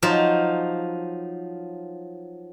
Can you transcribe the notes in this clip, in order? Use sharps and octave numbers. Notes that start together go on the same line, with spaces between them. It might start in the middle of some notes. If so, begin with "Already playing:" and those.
F3 F#3 D#4 F4